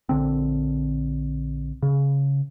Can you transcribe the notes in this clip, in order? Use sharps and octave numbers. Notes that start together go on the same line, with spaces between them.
A#1 D3 C4
C#3